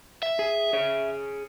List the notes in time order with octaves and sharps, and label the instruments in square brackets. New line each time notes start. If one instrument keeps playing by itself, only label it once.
[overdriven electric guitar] E5
[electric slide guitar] G#4
G#4 C#5